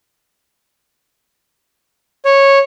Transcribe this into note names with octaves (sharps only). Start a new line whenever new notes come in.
C#5